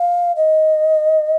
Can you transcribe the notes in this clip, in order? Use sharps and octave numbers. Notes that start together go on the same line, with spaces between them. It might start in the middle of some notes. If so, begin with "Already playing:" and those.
Already playing: F5
D#5